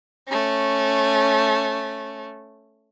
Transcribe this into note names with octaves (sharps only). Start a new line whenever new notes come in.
A3 C#4